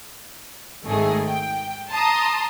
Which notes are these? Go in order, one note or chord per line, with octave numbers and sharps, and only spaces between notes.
G#1 G#2 D#3 A3 G#4
G5
A5 A#5 C6 D#6